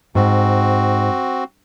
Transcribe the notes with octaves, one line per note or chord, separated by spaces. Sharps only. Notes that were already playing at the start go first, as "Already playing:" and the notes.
G#2 C4 F#4